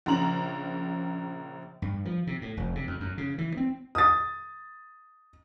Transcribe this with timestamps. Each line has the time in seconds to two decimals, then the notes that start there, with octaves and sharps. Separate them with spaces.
0.06 A#1 C#3 A#5 F#7
1.82 G2
2.05 F3
2.27 C3
2.42 A2
2.57 F1
2.75 C3
2.87 F2
3.00 F#2
3.18 C#3
3.38 E3
3.57 C4
3.95 D#6 A6